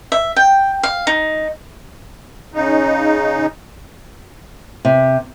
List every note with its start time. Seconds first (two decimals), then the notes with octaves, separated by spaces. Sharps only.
0.12 E5
0.36 G5
0.83 F5
1.07 D#4
2.54 C#3 D#4
4.85 C3